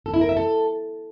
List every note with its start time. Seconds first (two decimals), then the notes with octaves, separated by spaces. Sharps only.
0.06 A4
0.14 E4
0.21 A#4
0.29 E5
0.37 A4